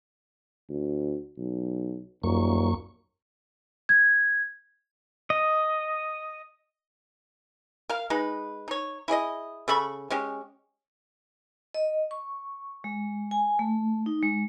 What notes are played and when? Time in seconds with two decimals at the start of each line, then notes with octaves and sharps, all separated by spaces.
0.69 D2
1.38 B1
2.24 D#1 F#2 A#3 C#6
3.89 G#6
5.30 D#5
7.89 A#4 F5
8.10 G#3 D#4 B4
8.68 D#4 C#5
9.08 E4 G#4 D5 D#5
9.68 C#3 A4 B5 C#6
10.10 G#3 C#4 G4
11.74 D#5
12.11 C#6
12.84 G#3
13.31 G#5
13.59 A3
14.06 D#4
14.22 G#3